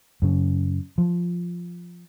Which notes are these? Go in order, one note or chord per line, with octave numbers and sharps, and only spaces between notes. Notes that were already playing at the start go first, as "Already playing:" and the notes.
F#2 C#3
F3